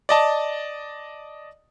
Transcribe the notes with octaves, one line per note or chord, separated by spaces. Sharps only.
D5 D#5 A5